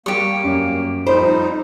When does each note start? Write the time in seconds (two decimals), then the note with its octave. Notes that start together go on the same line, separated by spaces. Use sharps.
0.06 G3 A#3 G4 C#6
0.44 F#2
1.07 F2 G3 D#4 C5 B5